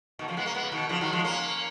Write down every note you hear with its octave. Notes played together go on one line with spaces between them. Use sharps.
B2 D#3
C#3 F3
G#3 B3
A#3 C#4
G#3 B3
C#3
B2 D#3
C#3 F3
D#3 F#3
F3 G#3
A#3 C#4